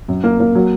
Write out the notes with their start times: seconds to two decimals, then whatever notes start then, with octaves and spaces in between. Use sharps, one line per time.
0.08 F#2
0.24 A#3
0.40 A#3
0.55 F#3